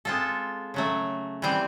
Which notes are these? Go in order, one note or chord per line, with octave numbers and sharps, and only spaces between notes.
G#3 C4 F4 A4
C#3 F#3 A3
E3 G3 C4